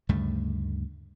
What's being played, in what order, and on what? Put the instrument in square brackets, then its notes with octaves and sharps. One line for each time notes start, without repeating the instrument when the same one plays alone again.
[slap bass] D2 G2 C#3 A3